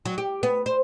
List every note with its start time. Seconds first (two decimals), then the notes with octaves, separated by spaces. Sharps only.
0.05 F#3
0.18 G4
0.43 B3
0.66 C5